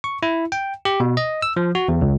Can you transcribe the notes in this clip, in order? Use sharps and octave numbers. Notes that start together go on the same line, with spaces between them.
C#6
E4
G5
G4
B2
D#5
E6
F3
F#4
E2
C#2